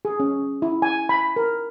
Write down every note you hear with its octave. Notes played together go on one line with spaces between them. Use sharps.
G#4
C#4
E4
G#5
B5
A#4